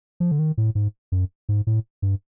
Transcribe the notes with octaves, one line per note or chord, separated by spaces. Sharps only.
F3
D3
D#3
A2
G#2
F#2
G#2
A2
G2